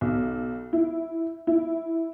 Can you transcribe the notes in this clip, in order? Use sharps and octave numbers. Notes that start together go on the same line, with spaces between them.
B1
E4
E4